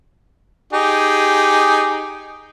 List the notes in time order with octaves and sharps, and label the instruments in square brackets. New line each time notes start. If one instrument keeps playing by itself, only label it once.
[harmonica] D#4 G4 G#4